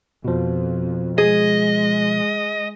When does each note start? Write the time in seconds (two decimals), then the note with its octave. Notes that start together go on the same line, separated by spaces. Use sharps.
0.25 F2 B2 F3
1.18 G#3 G#4 D#5